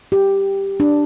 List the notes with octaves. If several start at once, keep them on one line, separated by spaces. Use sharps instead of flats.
G4
D4